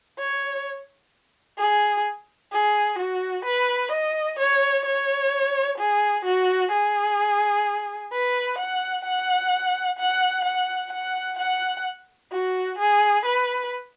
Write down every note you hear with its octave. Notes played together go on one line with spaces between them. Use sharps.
C#5
G#4
G#4
F#4
B4
D#5
C#5
C#5
G#4
F#4
G#4
B4
F#5
F#5
F#5
F#5
F#5
F#5
F#4
G#4
B4